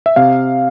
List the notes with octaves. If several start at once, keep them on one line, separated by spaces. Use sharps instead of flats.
E5
C3 F5